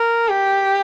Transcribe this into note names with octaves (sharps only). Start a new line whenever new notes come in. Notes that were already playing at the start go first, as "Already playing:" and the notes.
Already playing: A#4
G4